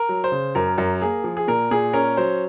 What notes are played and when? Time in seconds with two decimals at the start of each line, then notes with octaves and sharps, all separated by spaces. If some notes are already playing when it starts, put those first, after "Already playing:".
Already playing: A#4
0.09 F#3
0.24 C5
0.32 C#3
0.55 F#2 A#4
0.78 F#2
1.02 A#3 G#4
1.24 F3
1.37 G#4
1.48 A#2 A#4
1.71 A#2 G#4
1.93 C#4 A#4
2.17 F#3 C5